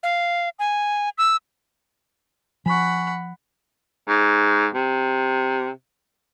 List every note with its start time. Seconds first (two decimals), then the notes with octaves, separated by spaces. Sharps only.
0.03 F5
0.59 G#5
1.18 E6
2.66 F3 F#5 G#5 B5 C#6
4.08 G#2
4.74 C3